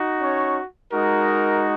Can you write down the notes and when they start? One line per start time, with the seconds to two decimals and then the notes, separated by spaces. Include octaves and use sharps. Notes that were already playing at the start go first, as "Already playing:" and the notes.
Already playing: D#4 F#4
0.20 C#4 C#5
0.91 G#3 D#4 F#4 A#4